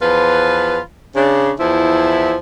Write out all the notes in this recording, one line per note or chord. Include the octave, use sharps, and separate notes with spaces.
E2 F3 F4 B4
C#3 D4
E2 F3 E4